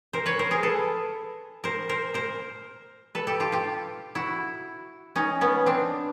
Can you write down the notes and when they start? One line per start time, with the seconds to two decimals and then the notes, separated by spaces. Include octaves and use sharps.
0.13 A#4 C5
0.26 B4 C#5
0.39 A#4 C5
0.51 G#4 A#4
0.63 A4 B4
1.64 A#4 C5
1.89 A#4 C5
2.14 A#4 C5
3.15 A4 B4
3.27 G4 A4
3.40 F4 G4
3.52 F4 G4
4.15 E4 F#4
5.16 C#4 D#4
5.41 B3 C#4
5.66 C4 D4